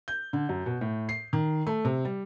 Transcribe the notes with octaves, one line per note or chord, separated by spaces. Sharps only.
G6
D3
F#2
B2
A2
C7
D#3
A3
C3
G3